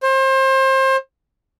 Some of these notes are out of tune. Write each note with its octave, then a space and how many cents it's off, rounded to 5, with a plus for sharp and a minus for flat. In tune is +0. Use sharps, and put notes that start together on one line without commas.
C5 +30